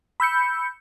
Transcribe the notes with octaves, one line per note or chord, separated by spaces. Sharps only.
B5 E6 G6 C#7